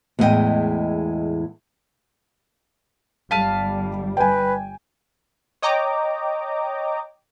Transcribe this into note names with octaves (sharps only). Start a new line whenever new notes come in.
E2 A2 G#3 F#4 D#5 G5
G1 G3 F5 A5 B6 D#7
B4 G5 G#5
C#5 D#5 G5 A#5 D6